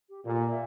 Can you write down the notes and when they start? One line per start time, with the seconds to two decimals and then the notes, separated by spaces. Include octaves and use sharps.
0.09 G4
0.25 A#2 A4
0.34 A#4
0.42 D5
0.51 E5